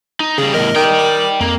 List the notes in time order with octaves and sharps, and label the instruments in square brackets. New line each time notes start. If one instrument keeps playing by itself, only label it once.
[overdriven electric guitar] D#4
[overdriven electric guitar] C#3 G3 [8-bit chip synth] G#4
[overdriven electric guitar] E2 A2 [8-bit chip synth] A#4 D#5
[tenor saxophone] D#3 [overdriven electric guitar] D5 G5
[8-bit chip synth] D6
[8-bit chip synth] F2 [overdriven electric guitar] A#3